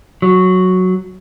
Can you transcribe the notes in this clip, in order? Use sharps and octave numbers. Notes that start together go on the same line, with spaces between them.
F#3